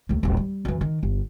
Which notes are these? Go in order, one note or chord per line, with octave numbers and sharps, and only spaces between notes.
D#2 A3
D#1 A1
G3
F#2 E3
D#3
G1